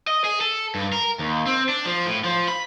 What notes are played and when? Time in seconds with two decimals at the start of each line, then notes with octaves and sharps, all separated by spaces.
0.07 D#5
0.24 G#4
0.41 A4
0.75 G2
0.93 A#4
1.19 D#2
1.46 C4
1.69 D4
1.86 F3
2.06 A2
2.24 F3
2.48 B5